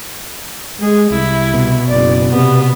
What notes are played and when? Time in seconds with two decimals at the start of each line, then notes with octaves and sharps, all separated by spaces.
0.81 G#3 G#4
1.10 C2 E4
1.54 B2
1.88 F#1 D5
2.32 C3 B3